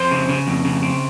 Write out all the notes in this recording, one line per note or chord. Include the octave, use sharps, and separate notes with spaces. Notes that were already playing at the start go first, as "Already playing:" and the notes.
Already playing: F2 C5 C6
C#3
C#3
F2
C#3
C4